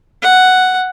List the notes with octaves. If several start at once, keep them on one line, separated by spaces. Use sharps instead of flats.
F#5